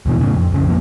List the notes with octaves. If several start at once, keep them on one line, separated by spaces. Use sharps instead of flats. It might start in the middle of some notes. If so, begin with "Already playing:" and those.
D#2 B2 E3
A2 C#3
F2
F1 C#3
F2 F3 A#3